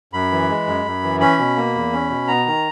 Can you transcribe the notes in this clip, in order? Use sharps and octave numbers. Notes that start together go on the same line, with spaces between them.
F#2 B5
E3
G#3
F#2
F#2
E3
C#4 B5
B2
A#3
E2
C#4
B2
B3 A#5
D#3